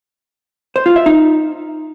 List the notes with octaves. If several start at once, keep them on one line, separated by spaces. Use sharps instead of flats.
C5
F4
E5
D#4